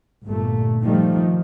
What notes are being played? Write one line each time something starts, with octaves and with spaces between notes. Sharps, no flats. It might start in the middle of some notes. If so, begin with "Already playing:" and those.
G1 A#2 A3
D#3 F3 G3 A3